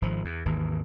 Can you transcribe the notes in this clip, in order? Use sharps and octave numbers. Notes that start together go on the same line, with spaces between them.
G#1 F3
E2
G#1 D#2 E3